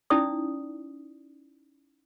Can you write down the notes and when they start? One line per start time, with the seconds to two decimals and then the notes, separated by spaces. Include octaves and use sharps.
0.10 C#4 D#4 E4 D5 D#6